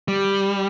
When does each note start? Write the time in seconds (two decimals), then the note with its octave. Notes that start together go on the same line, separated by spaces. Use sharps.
0.08 G3